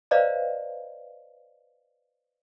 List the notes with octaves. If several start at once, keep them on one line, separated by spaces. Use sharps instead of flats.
B4 C5 D5 D#5 F5 A#5